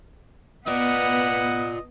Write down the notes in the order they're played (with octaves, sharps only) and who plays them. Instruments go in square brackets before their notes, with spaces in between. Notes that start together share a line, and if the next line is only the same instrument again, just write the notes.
[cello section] B3 [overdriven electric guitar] F4 D5 [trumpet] D#5 [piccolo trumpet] F#5